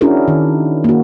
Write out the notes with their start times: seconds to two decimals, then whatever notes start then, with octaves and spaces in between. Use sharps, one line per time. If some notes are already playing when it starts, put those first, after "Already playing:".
0.01 C#4 D4 E4 F#4 G#4 A#4
0.28 D#3
0.84 A#3 F#4